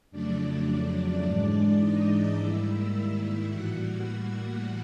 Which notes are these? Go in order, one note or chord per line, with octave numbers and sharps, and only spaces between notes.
F2 C#3 F#3 A3 D4 D5
D4 D5
G#2 E3 G#3
D#4 D#5
G#2 D#3 G3 A#3 E4 E5
A2 E3 G3 A#3 F#4 F#5